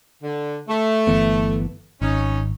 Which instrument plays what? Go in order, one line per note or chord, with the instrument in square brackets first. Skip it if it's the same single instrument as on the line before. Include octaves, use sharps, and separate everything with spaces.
[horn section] D3
A3
[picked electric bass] G1 E3 B3
[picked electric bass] G#1 [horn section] C#4 D#4